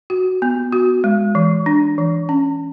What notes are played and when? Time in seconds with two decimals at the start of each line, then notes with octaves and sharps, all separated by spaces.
0.10 F#4
0.42 B3
0.72 F#4
1.04 G#3
1.35 E3
1.66 D4
1.98 E3
2.29 C#4